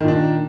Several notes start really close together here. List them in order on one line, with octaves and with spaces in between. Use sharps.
D#3 A#2 D4